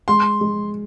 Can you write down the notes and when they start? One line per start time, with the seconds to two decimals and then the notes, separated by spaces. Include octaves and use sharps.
0.08 G#3 C6
0.41 G#3